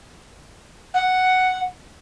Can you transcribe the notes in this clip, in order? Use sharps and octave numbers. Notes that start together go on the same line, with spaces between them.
F#5